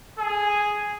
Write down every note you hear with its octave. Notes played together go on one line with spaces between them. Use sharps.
G#4